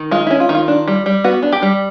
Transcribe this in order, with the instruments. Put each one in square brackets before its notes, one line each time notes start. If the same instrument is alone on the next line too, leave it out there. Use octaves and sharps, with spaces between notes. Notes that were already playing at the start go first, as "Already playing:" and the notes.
Already playing: [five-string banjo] D#3
G#3 F4
C#4 E4
F4
D#3
F4
D4
G3
G3
B3 F#4
D4
G4
G3